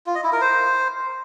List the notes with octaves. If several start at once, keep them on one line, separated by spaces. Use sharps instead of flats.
F4
D#5
E4
A#4
C5